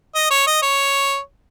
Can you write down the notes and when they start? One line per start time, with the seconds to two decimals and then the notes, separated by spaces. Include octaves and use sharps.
0.15 D#5
0.31 C#5
0.47 D#5
0.62 C#5